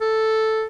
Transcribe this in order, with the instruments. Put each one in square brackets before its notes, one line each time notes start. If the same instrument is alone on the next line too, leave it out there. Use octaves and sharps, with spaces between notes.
[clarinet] A4